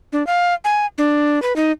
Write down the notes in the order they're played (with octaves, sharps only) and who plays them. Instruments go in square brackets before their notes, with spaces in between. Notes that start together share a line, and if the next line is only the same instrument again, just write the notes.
[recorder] D4
F5
G#5
D4
B4
D#4